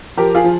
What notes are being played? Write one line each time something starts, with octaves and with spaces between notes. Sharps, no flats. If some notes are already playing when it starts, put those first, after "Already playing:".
F3 G4 A#4
F4 G#4
F3